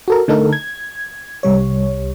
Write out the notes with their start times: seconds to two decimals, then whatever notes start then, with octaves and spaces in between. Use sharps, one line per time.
0.08 F#4 A4 A#4
0.28 D3 A3 D#4 A4 A#4
0.53 G#6
1.43 C2 G3 C#5